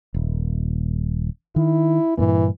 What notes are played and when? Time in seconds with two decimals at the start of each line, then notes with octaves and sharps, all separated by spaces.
0.14 D#1
1.56 D#3 E4
2.18 G2 A#2 E3 A#3